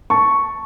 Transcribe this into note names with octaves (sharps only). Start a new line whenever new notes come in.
A5 C#6